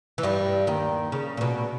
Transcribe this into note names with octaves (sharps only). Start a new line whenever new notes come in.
E3
G2 G3
D#2 D#3
C#3
A#2
B2